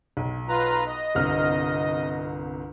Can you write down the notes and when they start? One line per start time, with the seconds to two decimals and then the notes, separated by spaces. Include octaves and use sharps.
0.17 B1
0.49 F4 B4 A#5
0.87 D#5
1.15 G1 C2 F6